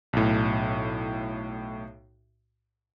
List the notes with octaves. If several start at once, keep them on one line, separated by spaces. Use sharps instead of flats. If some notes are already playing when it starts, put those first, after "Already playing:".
B1 A2